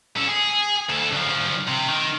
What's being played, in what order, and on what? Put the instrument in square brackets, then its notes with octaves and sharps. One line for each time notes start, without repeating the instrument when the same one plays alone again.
[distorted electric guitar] C#4 A4
G#4
D2 A4
D2 F3
C3
D#3